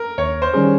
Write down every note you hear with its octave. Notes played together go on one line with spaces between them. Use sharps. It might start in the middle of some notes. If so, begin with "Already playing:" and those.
Already playing: A#4
D#2 C#5
C5
D#3 G3 C#4 G#4